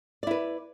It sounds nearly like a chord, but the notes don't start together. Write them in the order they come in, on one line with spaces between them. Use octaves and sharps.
D5 E4 B4